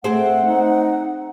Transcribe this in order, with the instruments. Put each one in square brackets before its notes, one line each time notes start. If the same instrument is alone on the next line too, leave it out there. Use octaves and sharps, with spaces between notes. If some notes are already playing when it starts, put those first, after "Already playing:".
[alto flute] A3 [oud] C4 G#4 C5 [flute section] F#5
[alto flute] D#4